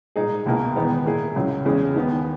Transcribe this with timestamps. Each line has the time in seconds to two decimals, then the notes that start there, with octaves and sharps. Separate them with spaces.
0.16 A#2 G#3 D#4 G#4
0.46 C#2 B2 A#3 E4
0.76 E2 D#3 G#3 B3 D#4
1.05 A#2 A#3 E4 G#4
1.36 C#2 C#3 F#3
1.65 E2 C#3 G#3 C#4 G#4
1.96 D#2 D#3 G#3 B3